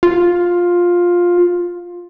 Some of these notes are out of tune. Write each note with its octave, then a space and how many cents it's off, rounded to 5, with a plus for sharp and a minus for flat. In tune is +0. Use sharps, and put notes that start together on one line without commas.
F4 +10